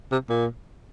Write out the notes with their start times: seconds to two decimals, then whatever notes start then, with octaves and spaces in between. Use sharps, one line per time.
0.12 C3
0.30 A#2